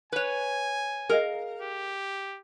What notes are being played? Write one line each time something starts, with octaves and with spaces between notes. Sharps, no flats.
B4 C#5 G#5
G#4 A#4 D#5 F5
G4